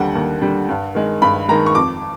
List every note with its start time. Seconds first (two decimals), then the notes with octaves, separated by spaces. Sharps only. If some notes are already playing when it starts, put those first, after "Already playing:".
Already playing: D#2 D3 G3 F#5 G5
0.15 D#2
0.42 D3 G3
0.69 G2
0.95 D#3 G#3
1.22 G2 B5
1.48 D#3 G#3 A#5
1.66 C#6
1.75 F2 D6